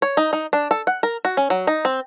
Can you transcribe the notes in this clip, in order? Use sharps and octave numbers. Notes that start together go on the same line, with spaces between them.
C#5
D#4
D#4
D4
A4
F#5
A#4
F#4
C#4
F#3
D#4
C4